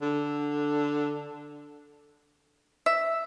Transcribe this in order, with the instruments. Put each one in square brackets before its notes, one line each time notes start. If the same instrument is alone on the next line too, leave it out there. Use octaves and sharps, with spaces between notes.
[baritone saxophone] D3
[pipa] E5